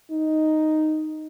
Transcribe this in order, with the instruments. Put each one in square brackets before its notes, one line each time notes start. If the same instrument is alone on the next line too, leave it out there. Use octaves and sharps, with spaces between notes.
[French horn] D#4